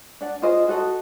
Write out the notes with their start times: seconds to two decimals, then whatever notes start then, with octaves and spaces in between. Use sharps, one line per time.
0.21 D4 D5 F#5
0.42 F4 G#4 C5 D#5
0.68 F#4 A4 D#5 F#5